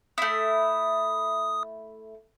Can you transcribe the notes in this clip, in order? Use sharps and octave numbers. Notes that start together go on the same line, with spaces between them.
A3 E4 D#6